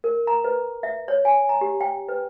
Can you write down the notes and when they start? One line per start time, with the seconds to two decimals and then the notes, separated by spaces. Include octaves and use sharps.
0.04 A#4
0.27 A#5
0.44 B4
0.83 E5
1.08 C#5
1.25 G#5
1.49 A#5
1.61 G4
1.81 G5
2.09 B4